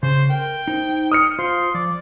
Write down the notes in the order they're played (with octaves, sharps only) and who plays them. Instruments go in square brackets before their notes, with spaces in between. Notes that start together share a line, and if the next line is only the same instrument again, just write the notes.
[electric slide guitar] C#3 [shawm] C5
[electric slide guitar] A#4 [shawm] G5
[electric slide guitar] D#4 C5
[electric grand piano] D#6 F6 C#7
[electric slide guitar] F4 C5 F5 [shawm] C6
[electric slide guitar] F3 [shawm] D5